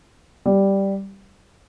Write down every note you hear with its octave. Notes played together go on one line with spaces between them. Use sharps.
G3